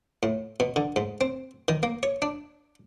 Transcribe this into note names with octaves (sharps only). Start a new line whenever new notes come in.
A2
B2
D3
G#2
C4
D#3
A#3
C#5
D4